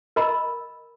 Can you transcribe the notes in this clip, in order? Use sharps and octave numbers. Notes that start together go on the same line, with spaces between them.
A#4 D#5 A#5 B5 E6